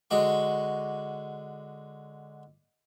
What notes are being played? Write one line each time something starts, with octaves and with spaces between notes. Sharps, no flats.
D3 G#3 F#4 D6